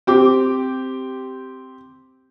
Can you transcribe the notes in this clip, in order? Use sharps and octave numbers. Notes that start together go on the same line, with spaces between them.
C4 G4 D6